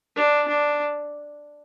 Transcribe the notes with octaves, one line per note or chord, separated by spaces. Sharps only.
D4
D4